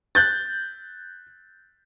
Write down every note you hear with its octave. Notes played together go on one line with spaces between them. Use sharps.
F#6 G6 A6